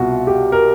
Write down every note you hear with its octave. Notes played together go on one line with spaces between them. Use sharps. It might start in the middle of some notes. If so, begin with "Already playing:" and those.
Already playing: C2 B2 F4 F#4
G4
A#4